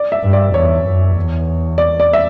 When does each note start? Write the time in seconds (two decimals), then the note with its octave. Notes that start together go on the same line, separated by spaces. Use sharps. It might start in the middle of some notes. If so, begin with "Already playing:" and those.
Already playing: D5
0.12 E5
0.23 G2
0.33 D5
0.54 E2 C#5
0.85 F#2
1.16 E2
1.78 D5
2.00 D5
2.13 E5